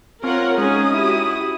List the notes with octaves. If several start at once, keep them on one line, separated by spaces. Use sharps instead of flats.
C4 F4 A#4 C#5 F#5
G#3 C#4 D#4 G#4 D#6
E4 F#4 G4